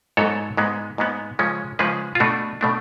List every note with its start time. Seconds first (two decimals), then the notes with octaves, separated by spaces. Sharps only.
0.17 G#2 F#3 B3 A4 C#5
0.57 G#2 G#3 B3
0.98 G#2 G#3 B3
1.39 C#3 F3 G#3 C#4
1.79 C#3 F3 G#3 C#4 G#4 B4
2.15 F4
2.20 B2 A3 D4 F#4
2.61 B2 A3 D4